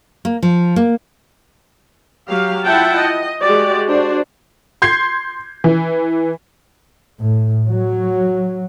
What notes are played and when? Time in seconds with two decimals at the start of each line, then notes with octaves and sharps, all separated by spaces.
0.25 A#3
0.43 F3
0.76 A#3
2.30 F#3 G4 F5
2.65 E4 F4 E5 F#5 G5 A5
2.96 D#5
3.41 G#3 F#4 G4 D5
3.87 D4 F#4 C5 D5
4.82 C6 G6 G#6 C7
5.64 E3
7.21 A2
7.67 F#3